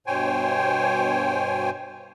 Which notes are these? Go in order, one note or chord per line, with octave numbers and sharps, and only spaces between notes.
G2 B2 C5 C#5 G5 G#5